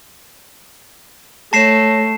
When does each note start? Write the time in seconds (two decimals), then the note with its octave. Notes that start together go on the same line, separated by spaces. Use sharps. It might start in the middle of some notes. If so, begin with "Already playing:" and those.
1.53 A3 C#5 A5 A#6 C7 E7